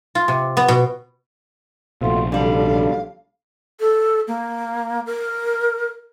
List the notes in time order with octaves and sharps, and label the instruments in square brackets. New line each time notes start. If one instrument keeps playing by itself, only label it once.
[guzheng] F4
C3
B3
B2
[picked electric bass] A#1 C3 [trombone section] A3 F4 F#4
[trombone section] B1 D4 A4 [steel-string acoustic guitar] D3 G3 [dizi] F5
[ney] A4
A#3
A#4